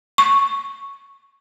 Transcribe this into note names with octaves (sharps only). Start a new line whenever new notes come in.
C#6